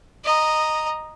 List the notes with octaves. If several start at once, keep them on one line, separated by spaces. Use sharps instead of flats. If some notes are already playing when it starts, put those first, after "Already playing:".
D#5 A#5